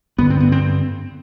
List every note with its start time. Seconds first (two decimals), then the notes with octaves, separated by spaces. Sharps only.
0.18 G2 D3 B3
0.30 C4
0.40 B3
0.52 C4